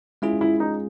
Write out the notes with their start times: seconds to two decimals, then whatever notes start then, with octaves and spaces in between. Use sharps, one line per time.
0.22 G#3 C#4 E4 F4 G#4
0.41 E4
0.60 D#4